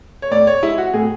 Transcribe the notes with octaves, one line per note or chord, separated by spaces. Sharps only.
C#5
A2 D5
C#5
G#3 E4
F#4
A2 G#4